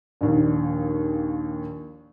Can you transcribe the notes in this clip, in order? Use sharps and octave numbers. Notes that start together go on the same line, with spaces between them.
A#1 D#2